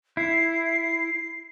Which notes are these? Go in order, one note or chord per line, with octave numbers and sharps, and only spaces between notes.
E4 C7